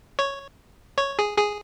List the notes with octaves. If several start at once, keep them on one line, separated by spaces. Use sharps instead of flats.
C#5
C#5
G#4
G#4